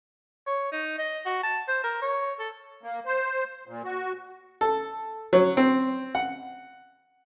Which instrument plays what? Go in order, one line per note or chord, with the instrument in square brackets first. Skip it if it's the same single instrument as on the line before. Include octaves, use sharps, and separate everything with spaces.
[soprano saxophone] C#5
D#4
D#5
F#4
A5
C5
A#4
C#5
A4
[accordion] A#3
C5
A#2
F#4
[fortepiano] A4
F#3
C4
F#5